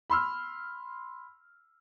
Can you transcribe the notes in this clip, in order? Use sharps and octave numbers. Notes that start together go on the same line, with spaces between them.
B5 C6 E6 F6